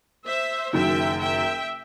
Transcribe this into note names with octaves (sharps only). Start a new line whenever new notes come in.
C5 E5
F#1 F#2 D#3 F#3 E5 G5
E5 G5